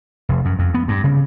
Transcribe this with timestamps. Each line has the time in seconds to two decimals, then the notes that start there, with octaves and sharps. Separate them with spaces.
0.29 F1
0.45 F#2
0.59 F2
0.74 B3
0.88 G2
1.04 C#3